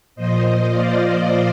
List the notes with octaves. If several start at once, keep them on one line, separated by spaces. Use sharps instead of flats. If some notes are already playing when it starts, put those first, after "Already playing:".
A#2 F3 C5 D#5
D5 F5